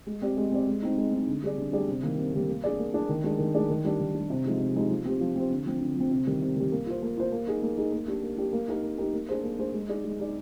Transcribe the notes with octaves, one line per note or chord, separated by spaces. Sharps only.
G#3
C4 G4 D5
G#3
C4 G4 D5
G#3
C4 D#4
G#3
C4 D#4
D3
G3 D4 G#4 D5
D3
G3 D4 G#4 D5
C3
D#3 G3 A#3
C3
D#3 G3 A#3
A#3
D4 G#4 D5
A#3
D4 G#4 D5
D#3
G#3 D4 G#4 D5
D#3
G#3 D4 G#4 D5
D#3
G3 D4
D#3
G3 D4
C3
F3 G#3 D#4
C3
F3 G#3 D#4
F3
C4 G4 C5
F3
C4 G4 C5
D3
F3 C4
D3
F3 C4
C3
D#3 G3
C3
D#3 G3
A#3
F4 C5
A#3
F4 C5
A#3
D#4 G#4
A#3
D#4 G#4
A#3
D4 G4
A#3
D4 G4
A#3
D#4 G4 A#4
A#3
D#4 G4 A#4
A#3
D4 G#4 C5
A#3
D4 G#4 C5
G#3
D#4 G#4 D5
G#3
D#4 G#4 D5